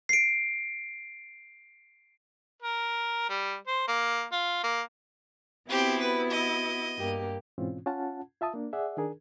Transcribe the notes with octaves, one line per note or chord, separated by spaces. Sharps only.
C7 D7
A#4
G3
C5
A#3
F4
A#3
B3 C4 E4 F#4 G4
B4
D#5
G2 A#3 G4
G#2 B2 E3 C4 C#4 F4
C#4 F4 F#5 A5
F4 E5 A5 D#6
A#3 D4
G#4 D5 E5 F#5
D#3 D4 G#4 A#4